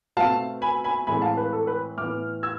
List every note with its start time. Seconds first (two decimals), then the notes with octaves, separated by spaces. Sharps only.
0.17 B2 A3 C4 F5 A5
0.62 G#5 B5
0.84 G#5 B5
1.07 A2 E3 G#3 C4 G#5 B5
1.22 F5 A5
1.37 B4
1.53 A4
1.67 B4
1.97 A2 E3 B3 D6 F6
2.43 E6 G#6